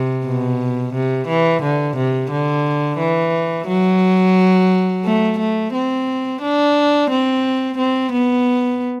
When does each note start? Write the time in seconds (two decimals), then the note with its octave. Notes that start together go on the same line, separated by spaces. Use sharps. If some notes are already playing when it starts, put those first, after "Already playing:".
Already playing: C3
0.26 B2
0.94 C3
1.28 E3
1.63 D3
1.97 C3
2.31 D3
2.99 E3
3.68 F#3
5.04 A3
5.39 A3
5.73 C4
6.42 D4
7.10 C4
7.78 C4
8.12 B3